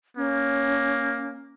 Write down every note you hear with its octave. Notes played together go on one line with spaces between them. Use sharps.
A#3 C#4